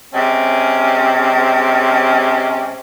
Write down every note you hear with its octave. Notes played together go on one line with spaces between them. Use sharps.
C3 G#3 C#4